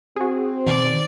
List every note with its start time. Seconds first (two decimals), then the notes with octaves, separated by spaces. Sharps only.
0.16 C4 F#4 G#4
0.66 B2 D#3 D5